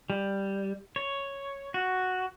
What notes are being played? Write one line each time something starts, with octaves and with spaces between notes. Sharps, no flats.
G3
C#5
F#4